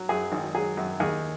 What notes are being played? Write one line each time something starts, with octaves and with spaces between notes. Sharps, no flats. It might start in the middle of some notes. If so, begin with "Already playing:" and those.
Already playing: F#3
F#2 G#4
G#1
F#3 G#4
F#2
D#2 G#4